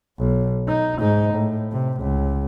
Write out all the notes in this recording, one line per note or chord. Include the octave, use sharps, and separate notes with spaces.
B1
D#4
G#2 D#4
A2
C3
C#2